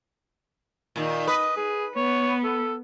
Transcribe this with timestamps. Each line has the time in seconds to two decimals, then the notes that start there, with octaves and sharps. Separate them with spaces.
0.96 A#2 D#3
1.27 B4 D#5
1.56 G#4
1.96 B3 C#5
2.44 A4